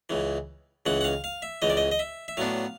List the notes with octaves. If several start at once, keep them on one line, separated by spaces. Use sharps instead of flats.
C#2 C#3 E3
C#2 C#3 E3 F#5
F#5
F5
F5
E5
C#2 C#3 E3 D#5
D5
D#5
D#5
E5
E5
A2 F#3 B3 D4 F5